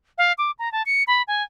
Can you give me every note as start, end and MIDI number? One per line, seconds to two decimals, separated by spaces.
0.18 0.32 77
0.38 0.51 86
0.59 0.71 82
0.72 0.82 81
0.86 1.03 97
1.07 1.22 83
1.28 1.43 80